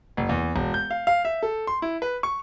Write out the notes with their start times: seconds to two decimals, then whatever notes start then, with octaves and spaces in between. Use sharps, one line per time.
0.17 F#1
0.29 E2
0.56 E1
0.74 G6
0.91 F5
1.07 F5
1.25 E5
1.43 A4
1.67 C6
1.82 E4
2.02 B4
2.23 C#6